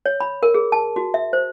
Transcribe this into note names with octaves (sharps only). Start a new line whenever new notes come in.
C#5
B5
A#4
G#4
A5
F#4
E5
C5